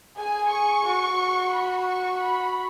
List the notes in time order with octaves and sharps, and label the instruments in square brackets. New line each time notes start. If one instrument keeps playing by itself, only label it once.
[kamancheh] G#4 [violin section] G#5
[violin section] C#6
[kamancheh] F#4
[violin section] B5
C#6
B5